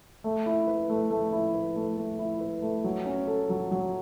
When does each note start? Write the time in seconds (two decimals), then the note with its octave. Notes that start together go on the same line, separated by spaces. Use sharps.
0.24 A3
0.46 E4
0.67 B4
0.90 A3
1.11 A3
1.33 E4
1.54 B4
1.76 A3
1.97 A3
2.19 E4
2.41 B4
2.62 A3
2.84 F#3
3.06 C#4
3.27 A4
3.50 F#3
3.71 F#3